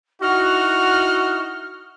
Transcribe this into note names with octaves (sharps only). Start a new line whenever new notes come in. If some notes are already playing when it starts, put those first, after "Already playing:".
D#4 E4 F#4 F6